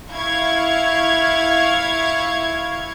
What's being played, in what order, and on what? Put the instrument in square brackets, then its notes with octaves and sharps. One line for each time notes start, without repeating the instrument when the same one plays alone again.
[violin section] E4 F5 C#6 G#6